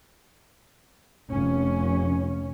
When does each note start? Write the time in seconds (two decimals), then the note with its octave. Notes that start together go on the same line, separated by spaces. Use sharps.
1.30 F1 C#4